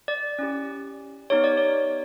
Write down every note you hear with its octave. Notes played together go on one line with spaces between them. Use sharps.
D5
C#4 E4 G4
B3 D#4 G4 C#5
D5
C#5